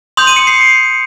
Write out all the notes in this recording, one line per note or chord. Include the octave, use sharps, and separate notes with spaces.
C6 D#6 G6 F7
D#7
C#7
C7